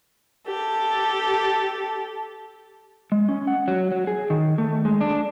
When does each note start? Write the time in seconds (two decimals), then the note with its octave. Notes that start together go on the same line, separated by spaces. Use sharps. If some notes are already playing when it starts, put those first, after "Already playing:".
0.48 G4 A4
3.12 G#3
3.29 C#4
3.47 F#5
3.68 F#3
3.92 F#3
4.07 G#4
4.30 D#3
4.58 A3
4.85 G#3
5.01 D4